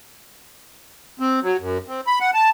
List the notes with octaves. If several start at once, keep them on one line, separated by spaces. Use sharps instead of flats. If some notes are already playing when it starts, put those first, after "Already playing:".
C4
F#3
F#2
C4
B5
F#5
A5